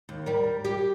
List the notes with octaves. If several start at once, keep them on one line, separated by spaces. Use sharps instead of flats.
D#2
G3 A#4
G4